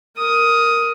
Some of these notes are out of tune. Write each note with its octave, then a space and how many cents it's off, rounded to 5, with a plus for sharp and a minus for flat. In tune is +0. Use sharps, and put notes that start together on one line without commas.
A#4 +0 D#6 +10